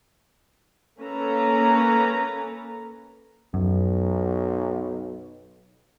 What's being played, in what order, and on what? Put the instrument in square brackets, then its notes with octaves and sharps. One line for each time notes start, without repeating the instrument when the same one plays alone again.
[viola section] A#3 C#4 A4 B4 A#5
[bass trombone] B1 [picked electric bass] F#2